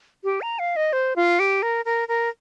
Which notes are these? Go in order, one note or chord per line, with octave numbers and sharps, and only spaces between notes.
G4
A#5
F5
D#5
C5
F4
G4
A#4
A#4
A#4